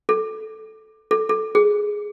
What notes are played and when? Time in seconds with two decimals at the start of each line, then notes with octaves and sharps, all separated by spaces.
0.09 A4
1.11 A4
1.29 A4
1.55 G#4